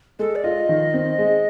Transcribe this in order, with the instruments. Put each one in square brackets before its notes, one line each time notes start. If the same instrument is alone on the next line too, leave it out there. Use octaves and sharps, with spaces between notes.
[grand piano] G#3 [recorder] A4
[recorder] D5
[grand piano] F4 [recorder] D#5
[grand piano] D#3
C4
G#3